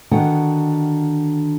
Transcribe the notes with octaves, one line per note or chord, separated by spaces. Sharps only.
D3 D#3 B3 F#4 F#5 G5